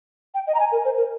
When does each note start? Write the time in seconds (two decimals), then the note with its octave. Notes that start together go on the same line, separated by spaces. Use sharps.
0.34 G5
0.47 D#5
0.54 A#5
0.60 G#5
0.72 A#4
0.84 C5
0.97 A#4